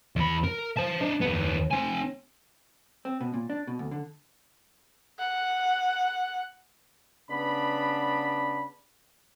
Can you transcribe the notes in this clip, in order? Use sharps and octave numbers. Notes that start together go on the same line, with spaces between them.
E2 B5
A#4
C5 A5
D4 D#5
D#2 B3
C4 G#5
C4
B2
A#2
D4
B2
D2
D3
F#5
C#3 B3 D4 B5